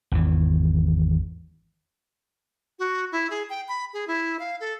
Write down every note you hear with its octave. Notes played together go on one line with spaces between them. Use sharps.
G#1 E2 E3
F#4
E4
G#4
G5
B5
G#4
E4
F5
A4